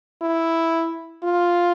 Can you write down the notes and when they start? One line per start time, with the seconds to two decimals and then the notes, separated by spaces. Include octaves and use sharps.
0.22 E4
1.23 F4